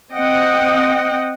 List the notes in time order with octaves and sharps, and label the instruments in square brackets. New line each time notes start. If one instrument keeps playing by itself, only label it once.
[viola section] C4 D#5 F#5 G5